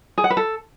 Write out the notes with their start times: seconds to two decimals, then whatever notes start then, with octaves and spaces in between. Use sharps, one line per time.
0.18 G#4
0.24 F#5
0.30 B4
0.37 A4